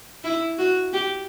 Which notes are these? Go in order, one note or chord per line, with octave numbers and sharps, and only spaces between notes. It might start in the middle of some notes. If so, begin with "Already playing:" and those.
E4
F#4
G4